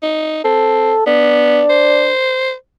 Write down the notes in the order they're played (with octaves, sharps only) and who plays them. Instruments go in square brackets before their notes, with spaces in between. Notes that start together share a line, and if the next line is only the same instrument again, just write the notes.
[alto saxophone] D#4
[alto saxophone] C4 [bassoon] A4
[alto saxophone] B3 [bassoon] D4
[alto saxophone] C5